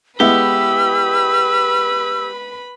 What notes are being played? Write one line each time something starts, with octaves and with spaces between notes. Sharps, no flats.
G#3 B3 E4 G4 B4 B5 E6